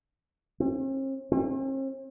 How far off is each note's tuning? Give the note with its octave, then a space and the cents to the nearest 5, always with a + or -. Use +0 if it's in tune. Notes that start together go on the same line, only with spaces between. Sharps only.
C4 +45
C4 +45